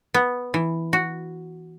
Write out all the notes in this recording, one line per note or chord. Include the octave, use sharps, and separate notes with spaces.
B3
E3
F#4